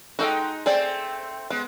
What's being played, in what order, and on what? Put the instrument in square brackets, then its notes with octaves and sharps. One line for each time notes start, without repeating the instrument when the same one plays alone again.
[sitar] G#3 D#4 [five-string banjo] F#4 A4 G5
[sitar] A3 C4 [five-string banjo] G#4 D5
[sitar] G#3 [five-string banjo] B3